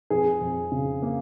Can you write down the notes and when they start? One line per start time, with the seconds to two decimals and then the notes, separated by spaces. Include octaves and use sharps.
0.10 F2 G#4
0.41 F2
0.72 C#3
1.02 A#3